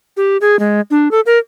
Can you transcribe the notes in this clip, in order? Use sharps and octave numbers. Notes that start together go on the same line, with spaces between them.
G4
G#4
G#3
D4
A4
A#4